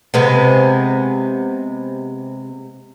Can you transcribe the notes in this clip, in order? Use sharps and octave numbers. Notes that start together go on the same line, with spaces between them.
C3 G#3 B3